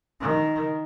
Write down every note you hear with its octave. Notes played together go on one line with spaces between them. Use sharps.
D#3